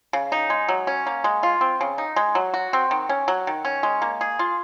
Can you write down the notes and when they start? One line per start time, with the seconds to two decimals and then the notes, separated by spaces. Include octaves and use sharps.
0.13 C#3
0.32 D#4
0.50 G#3
0.69 F#3
0.87 C#4
1.07 A#3
1.24 G#3
1.43 F4
1.61 C4
1.81 C#3
1.98 D#4
2.16 G#3
2.35 F#3
2.54 F#4
2.73 C4
2.91 D#3
3.09 C#4
3.28 F#3
3.47 D#3
3.65 C#4
3.83 G#3
4.02 A#3
4.21 G#4
4.39 F4